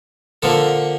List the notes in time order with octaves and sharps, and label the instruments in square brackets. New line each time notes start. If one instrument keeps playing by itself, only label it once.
[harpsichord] D3 F3 A#3 A4